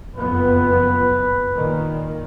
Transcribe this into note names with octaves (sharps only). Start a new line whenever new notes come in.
F#1 F2 B3 B4
A#2 D#3